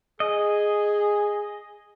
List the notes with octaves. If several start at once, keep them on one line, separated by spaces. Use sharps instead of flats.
G#4 D#5